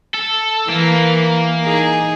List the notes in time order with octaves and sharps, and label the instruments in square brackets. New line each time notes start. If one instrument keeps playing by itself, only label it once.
[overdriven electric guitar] A4
[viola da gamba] E3 [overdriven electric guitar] A#3
[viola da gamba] D#4 G#4